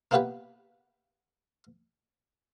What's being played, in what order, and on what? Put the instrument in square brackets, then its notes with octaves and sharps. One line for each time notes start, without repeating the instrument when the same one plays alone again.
[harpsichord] A#3 B3 E4 F4 G4 B4